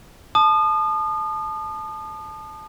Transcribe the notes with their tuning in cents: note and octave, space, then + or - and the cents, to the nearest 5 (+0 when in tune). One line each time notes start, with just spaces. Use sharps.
A5 -15 D#6 -35